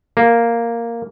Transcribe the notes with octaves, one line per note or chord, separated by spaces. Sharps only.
A#3